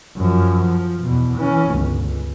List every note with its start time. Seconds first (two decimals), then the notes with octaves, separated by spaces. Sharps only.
0.17 F#2 F3
0.61 F3
1.02 E2 B2
1.37 E3 C#4
1.70 G1 C#2
2.02 C#2